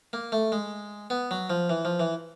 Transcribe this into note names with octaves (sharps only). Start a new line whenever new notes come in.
A#3
A3
G#3
B3
F#3
F3
E3
F3
E3